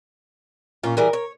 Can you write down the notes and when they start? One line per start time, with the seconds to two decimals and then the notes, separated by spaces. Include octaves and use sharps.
0.84 A#2 C#4 F4
0.97 E3 G3 G#4 A#4
1.13 C#5